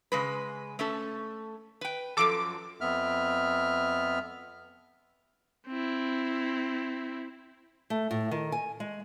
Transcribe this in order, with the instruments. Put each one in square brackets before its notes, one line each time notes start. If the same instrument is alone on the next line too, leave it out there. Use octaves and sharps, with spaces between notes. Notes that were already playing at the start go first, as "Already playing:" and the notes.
[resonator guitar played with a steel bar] C#3 G#3 B4
A3 C#4 A4
B4 G5
[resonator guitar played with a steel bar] F#2 F3 F#3 [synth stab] A4 D6
[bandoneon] F2 B3 E5 F6
[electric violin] C4 E4
[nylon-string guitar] A3
A2
D#3
G#5
G#3